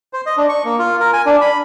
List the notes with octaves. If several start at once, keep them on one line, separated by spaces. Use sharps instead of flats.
C5
D#5
D4
C#6
A#3
F4
A#4
G#5
D4
B5